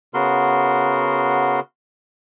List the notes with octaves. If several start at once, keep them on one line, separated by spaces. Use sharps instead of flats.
C#3 B3 F#4 A#4 C6